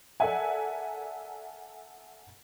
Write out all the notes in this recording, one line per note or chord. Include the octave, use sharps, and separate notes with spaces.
A4 A#4 D5 E5 F#5 G#5